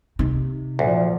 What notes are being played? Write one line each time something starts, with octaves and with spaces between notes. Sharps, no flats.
C3 D#4
D2 A#2 F3